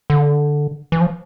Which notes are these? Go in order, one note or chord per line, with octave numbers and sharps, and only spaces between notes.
D3
E3
F3